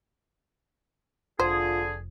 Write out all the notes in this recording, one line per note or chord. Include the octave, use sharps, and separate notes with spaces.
F1 D3 F4 G#4 C5